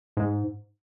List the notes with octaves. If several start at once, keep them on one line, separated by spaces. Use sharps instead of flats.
G#2